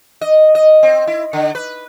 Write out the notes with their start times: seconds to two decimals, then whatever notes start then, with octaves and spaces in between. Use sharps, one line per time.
0.21 D#5
0.55 D#5
0.83 C4
1.07 E4
1.33 D3
1.55 B4